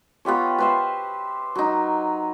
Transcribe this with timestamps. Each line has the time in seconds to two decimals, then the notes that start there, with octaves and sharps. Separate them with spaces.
0.25 B3 F4 G4 C#5
0.58 B4 C5 E5
1.55 F#3 D#4